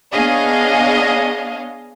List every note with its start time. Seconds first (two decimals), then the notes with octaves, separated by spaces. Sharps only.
0.10 B3 D4 G#4 C#5 D#5 F5